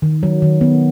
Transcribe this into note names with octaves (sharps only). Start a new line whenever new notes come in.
D#3
F#3
D#3
B3